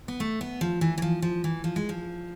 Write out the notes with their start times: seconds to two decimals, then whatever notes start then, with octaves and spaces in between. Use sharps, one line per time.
0.08 B3
0.20 A3
0.41 B3
0.61 F3
0.81 E3
0.98 E3
1.02 F3
1.22 F3
1.44 E3
1.64 F3
1.76 G#3
1.89 F3